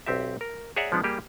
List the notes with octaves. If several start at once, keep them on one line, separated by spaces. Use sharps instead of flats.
B1 C4 G4 E5
A#4
G#4 C#5 D5 E5 F#5 A#5
F3 G#3 B3 D4
G3 A#3 G4 G#4